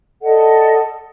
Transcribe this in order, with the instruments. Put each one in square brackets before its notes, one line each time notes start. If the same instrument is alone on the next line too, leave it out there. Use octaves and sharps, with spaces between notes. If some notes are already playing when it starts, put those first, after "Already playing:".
[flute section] A4 D5 D#5 F#5